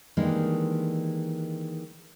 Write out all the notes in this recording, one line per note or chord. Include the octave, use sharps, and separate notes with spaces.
D#3 E3 G3 G#3 A#3 D4